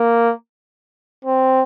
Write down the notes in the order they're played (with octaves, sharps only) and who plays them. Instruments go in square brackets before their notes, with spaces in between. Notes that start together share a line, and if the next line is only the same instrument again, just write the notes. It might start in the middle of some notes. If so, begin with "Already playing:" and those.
Already playing: [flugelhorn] A#3
C4